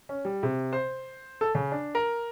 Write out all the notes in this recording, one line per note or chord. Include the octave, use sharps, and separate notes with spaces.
C#4
G3
C3
C5
A4
C#3
D4
A#4